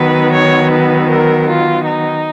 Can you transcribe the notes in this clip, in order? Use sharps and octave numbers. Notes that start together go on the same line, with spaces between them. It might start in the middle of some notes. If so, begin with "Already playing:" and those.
Already playing: D#3 F#3 B3 B4
C#5
B4
A#4
F4
D#4